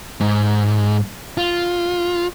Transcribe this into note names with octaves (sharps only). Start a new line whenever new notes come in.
G#2
F4